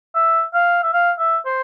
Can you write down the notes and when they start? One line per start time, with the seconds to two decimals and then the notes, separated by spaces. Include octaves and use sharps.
0.15 E5
0.54 F5
0.83 E5
0.93 F5
1.19 E5
1.46 C5